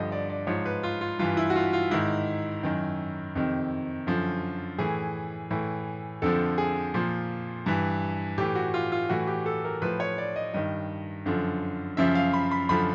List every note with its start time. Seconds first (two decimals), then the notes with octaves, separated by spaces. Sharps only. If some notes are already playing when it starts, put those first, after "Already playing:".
Already playing: G2 D3 F3 D#5
0.12 D5
0.30 D5
0.47 G#2 F3 C#5
0.66 B4
0.83 F4
1.01 F4
1.19 G2 E3 F4
1.37 E4
1.50 F#4
1.56 F4
1.73 F4
1.91 G#2 D#3 E4
2.63 F#2 D#3
3.36 F2 C3 D#3
4.07 F#2 D3 F3
4.78 A2 E3 G#4
5.51 A2 E3
6.22 F2 D3 F3 A4
6.58 G#4
6.94 A#2 F3
7.66 G2 E3
8.38 A2 E3 G4
8.55 F#4
8.74 F4
8.92 F4
9.09 A2 E3 F#4
9.27 G4
9.46 A4
9.64 A#4
9.82 A2 F3 B4
10.00 C#5
10.18 D5
10.36 D#5
10.54 G2 D#3 D#5
11.26 F#2 D3 F3
11.97 F#2 C#3 F3 E5
12.15 F5
12.33 B5
12.51 B5
12.69 F#2 D3 F3 B5